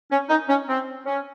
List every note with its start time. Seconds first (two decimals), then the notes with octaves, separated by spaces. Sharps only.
0.11 C#4
0.29 D#4
0.49 C#4
0.68 C4
1.06 C#4